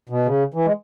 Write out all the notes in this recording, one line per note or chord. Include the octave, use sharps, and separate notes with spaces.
B2
C#3
E3
G#3